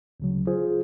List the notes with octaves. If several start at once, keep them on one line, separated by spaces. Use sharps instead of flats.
D2 C#3 F#3
F4 G#4 C5